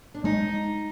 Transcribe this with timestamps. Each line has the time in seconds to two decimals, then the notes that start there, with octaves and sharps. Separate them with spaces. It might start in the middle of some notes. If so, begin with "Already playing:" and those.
0.14 D4
0.24 G#3 D#4